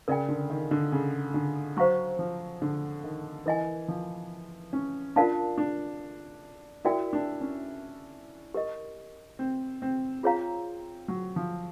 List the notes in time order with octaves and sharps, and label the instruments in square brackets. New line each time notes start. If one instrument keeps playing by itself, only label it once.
[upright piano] C#3 [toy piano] A#4 D5 G5
[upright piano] D3
D#3
D3
C#3
D3
[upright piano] F#3 [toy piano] C5 F5 A#5 C#6
[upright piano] F3
D3
D#3
[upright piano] E3 [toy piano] A#4 D#5 G#5
[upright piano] F3
C#4
[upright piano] D4 [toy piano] F4 A#4 D5 F5 A5
[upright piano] D4
[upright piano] E4 [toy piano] F#4 A#4 D5 G5
[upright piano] D4
C#4
[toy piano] G4 A#4 D#5
[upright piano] C4
C4
[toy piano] F4 G#4 C#5 F5 A#5
[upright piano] F#3
F3